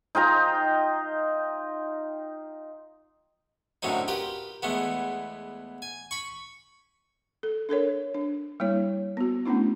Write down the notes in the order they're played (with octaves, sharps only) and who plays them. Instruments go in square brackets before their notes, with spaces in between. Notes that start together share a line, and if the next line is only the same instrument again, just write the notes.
[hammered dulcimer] D#4 F4 G5 A#5
[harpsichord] F#2 A2 D3 F#3 C4 D#4
F4 G4 A#4 B4
E2 G#3 A3 B3
G#5
B5 C#6
[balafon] A4
D4 A4 A#4 C#5
D4
G3 A#3 E4 C#5
B3 F#4
A3 B3 C#4 D4 E4